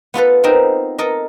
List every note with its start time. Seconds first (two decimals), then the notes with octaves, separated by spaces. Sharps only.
0.14 B3 F4 A4 B4
0.43 B3 C4 D#4 A#4
0.99 A4 A#4 D#5